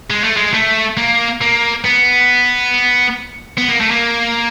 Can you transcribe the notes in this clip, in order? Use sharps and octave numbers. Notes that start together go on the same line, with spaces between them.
G#3
A3
G#3
A3
A#3
A#3
B3
B3
A#3
A3
A#3